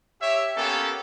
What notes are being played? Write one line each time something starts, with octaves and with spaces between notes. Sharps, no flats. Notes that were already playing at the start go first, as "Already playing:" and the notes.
G4 C#5 E5
A#3 B3 C#4 G4 A4